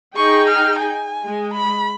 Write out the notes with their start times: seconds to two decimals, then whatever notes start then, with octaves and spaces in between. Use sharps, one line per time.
0.16 D#4 G#4 G5 C#6
0.48 F6
0.79 G#5
1.24 G#3
1.54 B5